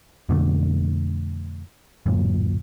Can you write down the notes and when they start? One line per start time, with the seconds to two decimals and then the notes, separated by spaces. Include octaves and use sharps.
0.29 F2 B2 D3 A3
2.06 D1 F#2 A#2